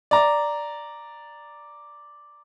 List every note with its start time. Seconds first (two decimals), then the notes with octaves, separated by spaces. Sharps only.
0.11 D5 A#5